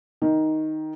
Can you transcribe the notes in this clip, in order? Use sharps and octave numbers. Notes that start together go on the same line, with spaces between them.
D#3